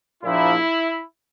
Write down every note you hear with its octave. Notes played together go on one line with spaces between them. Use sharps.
A#1 A#2 F3 E4